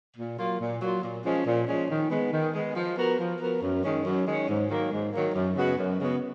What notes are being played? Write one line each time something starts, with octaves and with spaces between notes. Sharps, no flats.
A#2
F#3 A#3 F4
A#2
F#3 A#3 F4
A#2
F3 G#3 C#4
A#2
F3 G#3 C#4
D#3
G#3 B3
D#3
G#3 B3
F3
B3 F#4 A#4
F3
B3 F#4 A#4
F#2
D#3 G#3 C#4
F#2
D#3 G#3 C#4
G#2
D#3 F#3 A#3
G#2
D#3 F#3 A#3
F#2
C#3 G#3 B3 F#4
F#2
C#3 G#3 B3 F#4